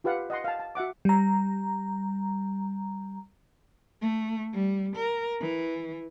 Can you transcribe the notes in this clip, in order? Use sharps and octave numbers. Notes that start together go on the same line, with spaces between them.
F4 G4 B4 F5 F#5
D#5 F#5 C6
F5 A5
A5
F#4 E5 F#5 D6
G3 A#5
A3
G3
A#4
E3